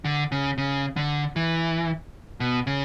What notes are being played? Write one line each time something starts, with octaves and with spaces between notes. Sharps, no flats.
D3
C#3
C#3
D3
E3
B2
C#3